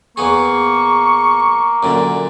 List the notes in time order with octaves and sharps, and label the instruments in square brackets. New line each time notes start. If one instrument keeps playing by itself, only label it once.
[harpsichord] E2 B3 G#4 [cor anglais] A#3 [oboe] C#6
[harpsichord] F#2 A#2 D3